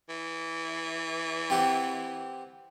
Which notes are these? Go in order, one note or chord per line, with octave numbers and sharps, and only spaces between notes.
E3
C4 G4 F#5